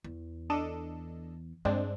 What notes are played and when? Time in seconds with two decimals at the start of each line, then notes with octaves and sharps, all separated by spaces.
0.04 E2
0.50 D4 A4 D#5
1.65 G2 G#3 C4 D4